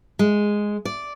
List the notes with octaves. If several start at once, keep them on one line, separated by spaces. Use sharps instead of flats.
G#3
D5